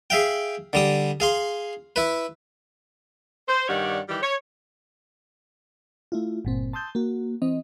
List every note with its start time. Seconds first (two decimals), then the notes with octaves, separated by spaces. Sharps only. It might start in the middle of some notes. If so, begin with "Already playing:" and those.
0.10 G#4 E5 F5 G5
0.73 D3 G3 D#6
1.20 G#4 F5 C6
1.96 E4 B4
3.48 C5
3.68 G2 D#3 G3 C#5 D5 F#5
4.09 D#3 E3 G3 G4
4.22 C#5
6.12 A3 E4 F4
6.45 G1 A#2 C4
6.73 A5 C6 D#6 E6 G6 A6
6.95 A#3 F#4
7.42 E3 C4 D#5